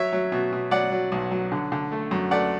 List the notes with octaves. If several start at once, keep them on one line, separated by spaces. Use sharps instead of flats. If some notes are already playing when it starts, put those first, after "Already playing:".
Already playing: F#3 C#5 E5
F#3
B2
B2
F#3 D5 F#5
F#3
B1
F#3
D3
D3
A3
F#2
A3 D5 F#5